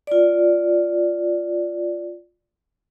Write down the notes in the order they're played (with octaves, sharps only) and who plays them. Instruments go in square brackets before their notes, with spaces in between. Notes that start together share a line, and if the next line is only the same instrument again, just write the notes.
[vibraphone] F4 D5